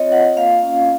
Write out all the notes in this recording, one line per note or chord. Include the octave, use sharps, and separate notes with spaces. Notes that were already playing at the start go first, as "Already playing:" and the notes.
Already playing: C4 F4 C#5 D#5
F4 F#5
A#3 F5
C#4